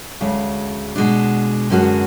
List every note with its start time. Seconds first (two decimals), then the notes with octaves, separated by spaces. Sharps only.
0.21 D2 C#3 G#3
0.96 B2 G#3 D4
1.70 F#2 D3 G#3 C#4 F#4